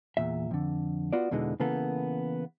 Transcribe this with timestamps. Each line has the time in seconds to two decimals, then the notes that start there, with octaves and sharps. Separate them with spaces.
0.17 E2 A#2 E5
0.51 F2 D3
1.13 B3 F4 F#4 D5
1.31 E2 B2 D3 E3 G#3 D#4
1.60 C#3 E3 A#3 B3 A4